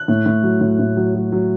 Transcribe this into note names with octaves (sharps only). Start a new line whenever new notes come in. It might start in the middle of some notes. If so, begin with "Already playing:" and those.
Already playing: F#6
A2
A2
F#3
A2
A2
F#3
F#3
F#3